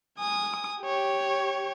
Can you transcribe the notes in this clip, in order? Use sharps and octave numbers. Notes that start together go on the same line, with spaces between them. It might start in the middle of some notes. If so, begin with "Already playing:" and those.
G#5 D#6
G4 C#5